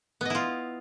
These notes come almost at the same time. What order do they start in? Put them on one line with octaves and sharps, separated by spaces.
B3 D#5 E4 F4